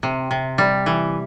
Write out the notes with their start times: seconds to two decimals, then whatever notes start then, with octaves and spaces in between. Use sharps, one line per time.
0.03 C3
0.31 C3
0.58 G3
0.86 E3